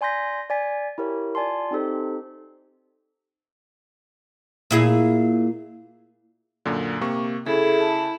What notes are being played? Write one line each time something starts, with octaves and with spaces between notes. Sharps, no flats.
D5 G#5 C6 G6 A#6 B6
D5 G#5 B6
E4 G4 A#4 C#5
F4 D5 G#5 A5 C6
C4 D#4 G4 A4 C5
A#2 E4 G#4
F#2 A#2 D3
C3 A#3 C#6
C#3 E4 G#4 A4
A5